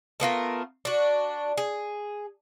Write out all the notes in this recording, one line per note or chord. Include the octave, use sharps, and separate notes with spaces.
A3 B3 F4 A#4
D4 F#4
G#4